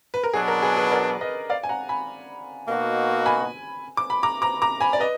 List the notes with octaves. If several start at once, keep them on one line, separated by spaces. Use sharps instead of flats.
B4
A#4
B2 F#3 B3 D4 G#4
A#4
G#4 B4
G#4 B4
A#4 D5
B4 D#5
D5 F5
G#5
F#5 A#5
G#5 B5
B2 A#3 D#4 F#4
G#5 B5
D6
B5
A#5 D6
A#5 D6
A#5 D6
G#5 B5
D5
B4 D#5